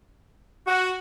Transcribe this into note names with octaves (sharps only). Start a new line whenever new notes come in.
F#4